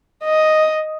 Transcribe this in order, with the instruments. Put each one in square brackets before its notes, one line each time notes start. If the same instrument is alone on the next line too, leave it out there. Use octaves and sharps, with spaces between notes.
[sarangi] D#5